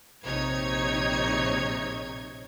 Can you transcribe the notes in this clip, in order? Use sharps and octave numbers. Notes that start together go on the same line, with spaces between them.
A#1 C3 D#4 C#5 G#6